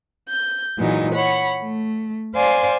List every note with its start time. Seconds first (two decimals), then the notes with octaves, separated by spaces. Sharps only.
0.28 G6
0.78 A#2 E3 F#3 G#3 D#4
1.14 C#5 F#5 B5
1.62 A3
2.35 C5 D5 F5 G#5 C6